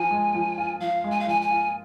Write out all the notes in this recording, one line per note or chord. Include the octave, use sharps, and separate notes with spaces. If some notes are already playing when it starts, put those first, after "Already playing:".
Already playing: F3 G#5
G#3
F3
F4
F3 F5
G#3
G#5
F5
F3 G#5
G#5
F4